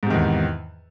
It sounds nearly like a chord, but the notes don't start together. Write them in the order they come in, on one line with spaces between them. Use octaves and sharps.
G#2 C3 D#3 E2